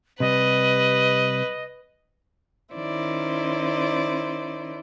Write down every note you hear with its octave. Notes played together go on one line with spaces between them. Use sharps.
C3 G3 B4 D#5
D#3 C#4 E4 C5 D5